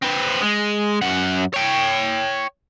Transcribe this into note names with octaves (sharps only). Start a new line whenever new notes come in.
C4 B4
G#3
F#2 F#5
C#5 G5